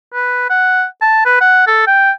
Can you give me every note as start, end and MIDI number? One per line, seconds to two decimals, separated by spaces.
0.14 0.49 71
0.50 0.85 78
1.01 1.24 81
1.25 1.39 71
1.41 1.67 78
1.67 1.86 69
1.87 2.11 79